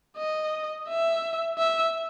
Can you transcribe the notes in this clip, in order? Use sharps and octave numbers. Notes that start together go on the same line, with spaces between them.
D#5
E5
E5